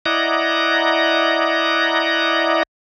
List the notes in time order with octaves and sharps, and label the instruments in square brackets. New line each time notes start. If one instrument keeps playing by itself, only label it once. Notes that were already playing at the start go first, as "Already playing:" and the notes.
[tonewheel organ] E4 D5 D#5 F#5 A#5